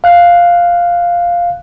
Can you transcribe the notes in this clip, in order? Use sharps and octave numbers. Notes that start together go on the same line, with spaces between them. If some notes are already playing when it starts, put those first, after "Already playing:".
F5 F#6